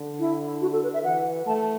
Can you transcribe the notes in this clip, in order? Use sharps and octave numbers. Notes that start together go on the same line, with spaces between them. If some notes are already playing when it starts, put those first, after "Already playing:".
Already playing: D3
E4
F#4
A4
B4
E5
E3 F#5
A3 A5